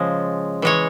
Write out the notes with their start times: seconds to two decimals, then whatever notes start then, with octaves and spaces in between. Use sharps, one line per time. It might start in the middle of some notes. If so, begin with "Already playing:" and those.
Already playing: C#3 F3 G#3
0.62 E3 G#3 C#5